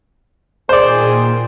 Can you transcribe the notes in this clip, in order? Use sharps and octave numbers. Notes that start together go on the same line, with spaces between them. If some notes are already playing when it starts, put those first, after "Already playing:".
A#2 D#3 G#4 C5 D5